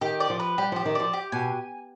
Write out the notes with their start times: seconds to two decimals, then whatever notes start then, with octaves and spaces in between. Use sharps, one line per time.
0.01 D#3 G4
0.20 D5
0.30 F3
0.40 B4
0.58 G3 G4
0.72 F3 G4
0.85 D#3
0.95 F3 D5
1.13 G4
1.32 B2 G#5